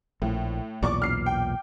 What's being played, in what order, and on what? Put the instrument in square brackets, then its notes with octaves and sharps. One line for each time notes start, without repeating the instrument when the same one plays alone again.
[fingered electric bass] A#1 [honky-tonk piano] A2
[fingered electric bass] B1 E2 A#2 [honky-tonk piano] D5 C#6 D6
[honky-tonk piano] F6 C7
G5